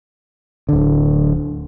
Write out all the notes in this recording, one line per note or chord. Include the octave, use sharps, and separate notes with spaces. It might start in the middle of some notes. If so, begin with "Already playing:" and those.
D1 D3